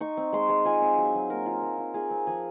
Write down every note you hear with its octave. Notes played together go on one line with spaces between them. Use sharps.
D#4 C#6
C4
G#3 C6
G#3 C6
F4 G#5
C4
F#3
F#3
A#3 A#4
F4
A#3
F4
F4 G#4
C4
F3 G#4